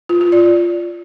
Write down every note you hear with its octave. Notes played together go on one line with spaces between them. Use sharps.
F4
F4
D5